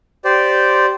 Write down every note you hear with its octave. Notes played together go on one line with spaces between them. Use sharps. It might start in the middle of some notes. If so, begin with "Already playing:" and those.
G4 C5 D5